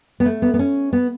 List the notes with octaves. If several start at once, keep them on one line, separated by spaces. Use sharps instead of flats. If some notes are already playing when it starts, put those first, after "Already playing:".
B3
A3
B3
B3
C#4
B3